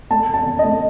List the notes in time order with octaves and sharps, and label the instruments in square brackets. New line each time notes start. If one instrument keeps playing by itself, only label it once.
[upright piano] A3 A5
C#3
A5
C#3
D#5
A3